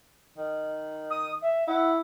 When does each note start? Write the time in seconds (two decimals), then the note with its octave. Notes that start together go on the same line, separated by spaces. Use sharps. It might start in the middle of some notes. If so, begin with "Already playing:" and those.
0.38 D#3
1.10 D#6
1.42 E5
1.68 E4 F#5